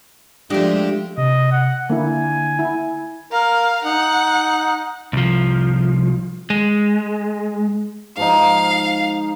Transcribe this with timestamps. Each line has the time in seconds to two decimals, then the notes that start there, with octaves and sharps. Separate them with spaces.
0.50 F3 G#3 A3 D4 G4
1.18 C3 D#5
1.52 F#5
1.90 D3 A#3 E4 G#5
2.59 E4
3.32 A#4 F5
3.84 D#4 F#5
5.13 C2 F3
6.50 G#3
8.17 G#2 F3 D#4 F5